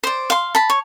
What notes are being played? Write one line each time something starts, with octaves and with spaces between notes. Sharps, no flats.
C5 D5
F5 C6
A5 B5
C#5